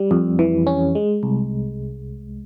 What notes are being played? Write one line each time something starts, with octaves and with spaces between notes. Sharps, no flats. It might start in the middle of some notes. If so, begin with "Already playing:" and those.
Already playing: G3
F2
E3
C#4
G#3
C2